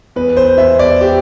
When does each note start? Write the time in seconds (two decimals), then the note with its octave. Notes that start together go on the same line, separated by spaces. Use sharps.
0.16 E2 B4
0.37 C5
0.58 E2 E5
0.79 D5
1.01 G4